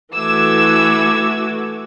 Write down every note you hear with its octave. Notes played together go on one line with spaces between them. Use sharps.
E3 A3 F#4 D6 E6 G#6